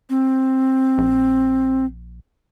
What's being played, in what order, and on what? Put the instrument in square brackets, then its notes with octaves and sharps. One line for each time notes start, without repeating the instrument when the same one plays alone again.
[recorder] C4
[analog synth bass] A#1